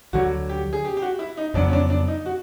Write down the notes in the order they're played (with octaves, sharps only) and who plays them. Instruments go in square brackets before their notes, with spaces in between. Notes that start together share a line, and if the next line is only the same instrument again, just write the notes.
[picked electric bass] D2 D3 F#3 [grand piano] F#4
[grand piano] G4
G#4
G4
G4
F#4
E4
D#4
[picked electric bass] F2 C#3 F#3 B3 [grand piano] D4
[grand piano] C#4
D4
D4
D#4
F#4